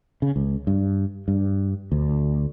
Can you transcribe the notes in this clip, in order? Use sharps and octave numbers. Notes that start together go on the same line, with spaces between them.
C#3
C#2
G2
G2
D2